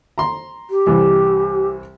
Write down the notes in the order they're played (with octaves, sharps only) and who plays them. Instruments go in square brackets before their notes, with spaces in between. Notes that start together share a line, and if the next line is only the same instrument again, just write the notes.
[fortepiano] A#5 C6
[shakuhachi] G4
[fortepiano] C2 E3 G3